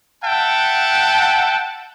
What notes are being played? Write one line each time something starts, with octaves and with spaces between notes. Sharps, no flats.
E5 F#5 G5 A5